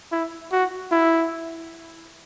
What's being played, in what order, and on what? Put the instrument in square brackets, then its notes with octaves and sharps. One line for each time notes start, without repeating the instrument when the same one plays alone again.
[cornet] E4
F#4
E4